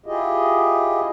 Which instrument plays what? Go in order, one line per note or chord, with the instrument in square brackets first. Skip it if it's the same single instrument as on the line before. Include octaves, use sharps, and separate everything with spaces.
[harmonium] E4 F4 G4 G#4 D#5